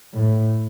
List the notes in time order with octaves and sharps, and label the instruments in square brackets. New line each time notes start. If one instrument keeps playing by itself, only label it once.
[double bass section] A2